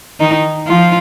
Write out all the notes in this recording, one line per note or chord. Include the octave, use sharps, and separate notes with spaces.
D#3 D#4
F3 F4